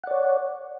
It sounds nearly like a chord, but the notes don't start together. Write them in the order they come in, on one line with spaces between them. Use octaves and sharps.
F#5 D5 C#5